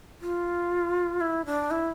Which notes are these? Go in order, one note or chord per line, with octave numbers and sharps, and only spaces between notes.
F4
E4
D4
E4